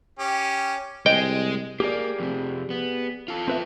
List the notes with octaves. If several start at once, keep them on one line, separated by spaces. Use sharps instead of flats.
C#4 G4
C2 G#3 D#5 G5
A#3 G4 G#4 D5
F2 C3
B3
F4 A4
C4 B4 E5